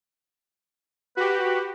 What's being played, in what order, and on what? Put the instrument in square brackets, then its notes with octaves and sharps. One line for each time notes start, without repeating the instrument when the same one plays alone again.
[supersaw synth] F#4 G4 [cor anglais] B4